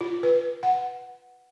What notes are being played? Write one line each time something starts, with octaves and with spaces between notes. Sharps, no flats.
F4
B4
F#5